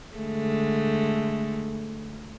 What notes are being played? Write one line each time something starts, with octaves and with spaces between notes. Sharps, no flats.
D3 G#3 A3